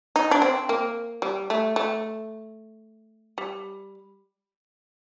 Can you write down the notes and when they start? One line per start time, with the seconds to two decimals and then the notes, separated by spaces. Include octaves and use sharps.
0.16 D#4
0.31 D4
0.42 C4
0.69 A#3
1.22 G3
1.50 A3
1.76 A3
3.38 G3